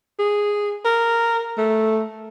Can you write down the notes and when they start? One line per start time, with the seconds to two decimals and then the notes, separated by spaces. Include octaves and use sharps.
0.19 G#4
0.85 A#4
1.58 A3